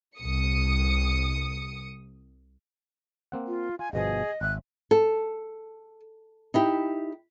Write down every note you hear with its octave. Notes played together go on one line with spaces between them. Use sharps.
C2 D#6 C#7
A#3 C4 F#5
F4
F4 G#5
G1 B2 F3 G#4 D#5
G#1 E5 F#6
A4
D#4 E4 G4